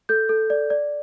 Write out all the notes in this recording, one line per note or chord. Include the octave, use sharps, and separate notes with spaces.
A4 G6
A4
D5
D5